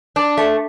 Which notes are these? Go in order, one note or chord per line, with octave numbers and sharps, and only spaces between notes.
D4
A3